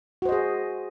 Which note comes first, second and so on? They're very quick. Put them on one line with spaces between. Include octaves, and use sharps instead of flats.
F#4 C5 D#5 G#4